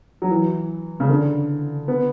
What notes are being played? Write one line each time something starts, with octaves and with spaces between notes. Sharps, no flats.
F#3
E3
C#3
D3
B3